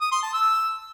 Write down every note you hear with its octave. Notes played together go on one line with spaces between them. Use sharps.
D#6
C6
A5
E6